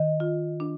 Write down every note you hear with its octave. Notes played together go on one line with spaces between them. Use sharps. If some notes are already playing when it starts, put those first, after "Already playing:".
Already playing: D#3 D#5
F4
D4